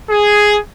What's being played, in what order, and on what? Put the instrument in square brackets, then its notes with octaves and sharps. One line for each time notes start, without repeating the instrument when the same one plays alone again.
[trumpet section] G#4